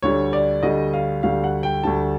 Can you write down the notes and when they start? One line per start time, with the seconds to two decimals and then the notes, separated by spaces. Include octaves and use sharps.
0.02 D2 D3 G3 C#5
0.33 D5
0.63 D2 D3 G3 D#5
0.94 F5
1.23 D2 D3 G3 F5
1.44 F#5
1.63 G5
1.83 D2 D3 G3 A5